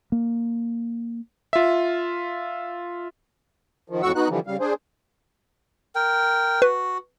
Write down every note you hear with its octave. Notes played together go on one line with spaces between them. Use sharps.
A#3
F4 E5
D#3 F3
F2 A2 F#4 F#5 C#6 E6
B3 D#4 F#4 F#6
D3 E3 F3 G3
C#3 G3 F5
D4 G#4 C5
A#4 G5
F#4 B4